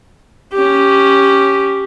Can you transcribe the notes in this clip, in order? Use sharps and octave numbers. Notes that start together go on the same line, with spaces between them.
C#4 G4